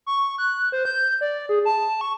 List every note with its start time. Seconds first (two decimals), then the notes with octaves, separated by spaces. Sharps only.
0.06 C#6
0.38 F#6
0.72 C5
0.85 G6
1.21 D5
1.49 G#4
1.65 A5
2.01 C#6